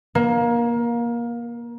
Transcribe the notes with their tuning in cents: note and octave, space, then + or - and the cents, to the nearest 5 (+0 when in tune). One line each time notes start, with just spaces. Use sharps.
A#3 +20